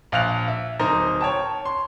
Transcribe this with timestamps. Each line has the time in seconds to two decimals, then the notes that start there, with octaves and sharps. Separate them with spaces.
0.12 A#1 F5 F#6 F7
0.48 E5
0.79 D1 D#4 A#4 C5
1.21 C#5 G5 A5
1.65 C6